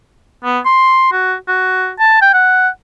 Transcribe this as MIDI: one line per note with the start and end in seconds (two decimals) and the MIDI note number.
0.44 0.59 59
0.65 1.08 84
1.12 1.35 66
1.48 1.90 66
2.00 2.18 81
2.22 2.29 79
2.34 2.68 78